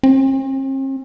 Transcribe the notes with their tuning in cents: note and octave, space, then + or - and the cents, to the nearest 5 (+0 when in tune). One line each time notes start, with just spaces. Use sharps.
C4 +45